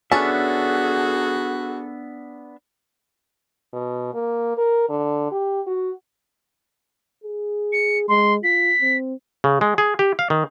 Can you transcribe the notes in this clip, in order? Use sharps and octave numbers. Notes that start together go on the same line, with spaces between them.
B3 C#4 D4 F#4 G#4 A4 E5 A5
B2
A#3
A#4
D3
G4
F#4
G#4
C#7
G#3 C6
F4 B6
C4
C#3
G#3
G#4
G4
F5
D#3